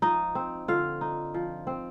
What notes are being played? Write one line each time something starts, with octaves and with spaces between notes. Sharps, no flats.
F3 D#4 D#5
C4
D3 F4 F5
D#4
F3
C4